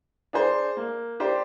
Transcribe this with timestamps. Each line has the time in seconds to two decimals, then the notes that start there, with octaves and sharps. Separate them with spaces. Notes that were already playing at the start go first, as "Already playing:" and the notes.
0.33 D4 G#4 C5
0.77 A#3
1.20 D4 G4 C5